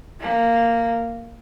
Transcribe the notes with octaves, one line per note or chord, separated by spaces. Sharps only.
A#3